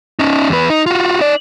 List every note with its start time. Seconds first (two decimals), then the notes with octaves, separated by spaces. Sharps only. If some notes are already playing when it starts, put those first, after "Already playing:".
0.19 C#4 D#4
0.49 E2 B4
0.70 D#4
0.86 F4 F#4
1.20 D#4 D5